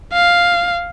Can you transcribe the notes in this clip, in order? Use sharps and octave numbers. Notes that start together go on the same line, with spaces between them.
F5